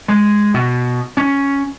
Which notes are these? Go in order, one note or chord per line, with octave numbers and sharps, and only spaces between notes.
G#3
B2
C#4